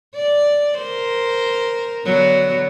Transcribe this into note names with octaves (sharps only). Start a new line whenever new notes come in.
D5
A#4 C5
D3 F#3 B3